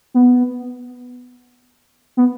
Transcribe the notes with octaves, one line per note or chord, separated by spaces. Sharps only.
B3
B3